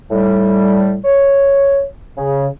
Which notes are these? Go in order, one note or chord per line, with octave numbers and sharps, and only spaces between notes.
A2 G3
C#5
C#3